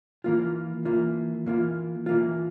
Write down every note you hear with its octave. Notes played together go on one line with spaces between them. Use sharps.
E3 A#3 F4
E3 A#3 F4
E3 A#3 F4
E3 A#3 F4